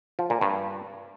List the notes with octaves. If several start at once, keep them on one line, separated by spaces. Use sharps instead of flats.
F3
A#2
G2